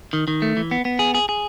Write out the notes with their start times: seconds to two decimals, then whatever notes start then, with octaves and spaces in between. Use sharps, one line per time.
0.13 D#3
0.28 D#3
0.42 A3
0.57 E3
0.71 B3
0.85 B3
0.99 G#4
1.15 G#4
1.29 G#4